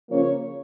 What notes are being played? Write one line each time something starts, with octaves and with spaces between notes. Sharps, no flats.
C#3 F3 A#3 C#4 C#5